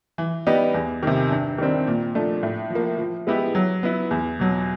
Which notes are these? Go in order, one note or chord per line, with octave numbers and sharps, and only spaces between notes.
E3
G3 B3 D#4 G4
E2
C3 D#3
G2
D#3 G3 C4
A#2
F3 A3 D4
A2
F3 A#3
F3
G#3 B3 E4 G4
F#3
B3 E4
E2
B2 F#3